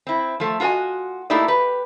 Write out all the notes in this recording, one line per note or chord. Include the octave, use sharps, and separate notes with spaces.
C4 E4
F3 A3
F4 F#4 A#4 D#5 G#5
A3 A#3 D#4 E4 G4 D5
G4 B4